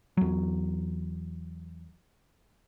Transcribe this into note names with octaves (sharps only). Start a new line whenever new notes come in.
E2 F#3